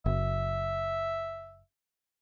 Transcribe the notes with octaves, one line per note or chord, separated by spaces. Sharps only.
F#1 E5